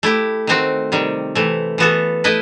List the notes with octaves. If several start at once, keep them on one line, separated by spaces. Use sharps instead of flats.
A3 E4 G4
D#3 A3 C4 F#4
C3 D#3 G3
C3 E3 A3
E3 B3 F#4 A4
A3 E4 B4 D#5